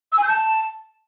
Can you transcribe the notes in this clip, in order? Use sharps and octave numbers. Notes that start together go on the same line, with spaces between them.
E6
G#5
G6
A5